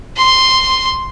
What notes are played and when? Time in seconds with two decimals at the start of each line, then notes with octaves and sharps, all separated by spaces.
0.16 C6